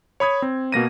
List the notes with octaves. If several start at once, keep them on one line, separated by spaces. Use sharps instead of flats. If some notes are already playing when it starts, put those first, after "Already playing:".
C#5 B5 D#6 G#6
C4
B2 A#3 A#6 D#7